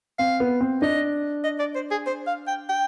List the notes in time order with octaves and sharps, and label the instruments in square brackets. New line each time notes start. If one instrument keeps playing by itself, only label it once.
[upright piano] C4 [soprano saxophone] F5
[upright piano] B3
C4
[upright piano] D4 [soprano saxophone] D#5
[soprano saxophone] D#5
D5
C5
G#4
C5
F5
G5
G5